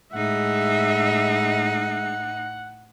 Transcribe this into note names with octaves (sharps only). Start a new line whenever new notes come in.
A2 G#3 D#4 E5 F#5